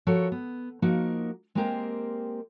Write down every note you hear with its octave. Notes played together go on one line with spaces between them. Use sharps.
F3 F#4 A4 A#4 C#5
B3
F3 A#3 D#4 F#4 A#4
G#3 A#3 C4 G4 A#4 C5